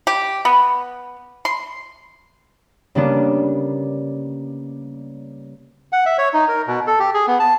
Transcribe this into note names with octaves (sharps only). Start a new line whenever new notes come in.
G4
B3
C6
C#3 G3 A#3 B3 D4
F#5
E5
C#5
D#4
A#4
B2
A4
G4
G#4
B3
A5